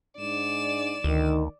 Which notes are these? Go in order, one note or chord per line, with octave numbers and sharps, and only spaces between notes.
G#2 D4 D5 E7
D2 D#3